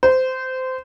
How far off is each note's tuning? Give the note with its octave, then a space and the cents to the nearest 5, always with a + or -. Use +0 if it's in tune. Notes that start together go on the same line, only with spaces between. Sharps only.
C5 -20